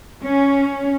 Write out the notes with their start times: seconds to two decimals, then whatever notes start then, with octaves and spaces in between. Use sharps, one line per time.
0.23 C#4